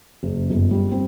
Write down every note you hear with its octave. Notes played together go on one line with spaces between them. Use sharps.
F#1
G1
G3
C4